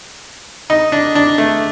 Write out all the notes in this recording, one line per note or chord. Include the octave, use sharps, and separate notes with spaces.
D#4
D4
D4
A3